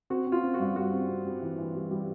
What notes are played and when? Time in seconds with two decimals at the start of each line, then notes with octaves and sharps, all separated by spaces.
0.10 C4 F#4
0.27 C4
0.32 F4
0.43 C4
0.54 F#4
0.60 G2
0.76 G3 F#4
0.92 C4
1.09 C4
1.25 G3
1.42 E3
1.58 E3
1.75 G3
1.91 G3